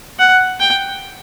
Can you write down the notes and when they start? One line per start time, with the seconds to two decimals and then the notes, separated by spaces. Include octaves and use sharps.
0.19 F#5
0.60 G5